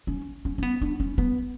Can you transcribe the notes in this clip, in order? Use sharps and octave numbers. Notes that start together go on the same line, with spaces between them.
C#4
C#4
C#4
B3
D4
C#4
B3